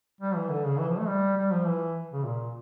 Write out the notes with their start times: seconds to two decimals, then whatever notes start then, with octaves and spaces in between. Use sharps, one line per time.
0.21 G3
0.35 E3
0.50 D3
0.64 C#3
0.79 E3
0.89 F3
0.98 A3
1.08 G3
1.37 G3
1.51 F3
1.66 E3
2.13 C#3
2.24 A#2